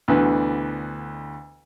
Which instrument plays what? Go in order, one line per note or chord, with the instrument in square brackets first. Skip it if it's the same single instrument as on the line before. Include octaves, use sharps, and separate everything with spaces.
[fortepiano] D2 B2 D3 E3 B3 B4